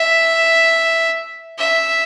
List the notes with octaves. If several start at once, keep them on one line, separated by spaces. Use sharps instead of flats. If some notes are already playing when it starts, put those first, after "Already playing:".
Already playing: E5
E5